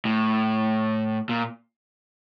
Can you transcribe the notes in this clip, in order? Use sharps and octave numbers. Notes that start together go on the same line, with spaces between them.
A2
A#2